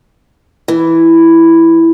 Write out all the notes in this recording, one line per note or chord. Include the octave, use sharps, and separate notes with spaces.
E3